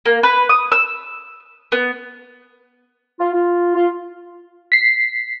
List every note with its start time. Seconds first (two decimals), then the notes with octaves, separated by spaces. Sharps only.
0.06 A#3
0.23 B4
0.49 D#6
0.72 E6
1.72 B3
3.20 F4
3.33 F4
3.75 F4
4.72 B6 C7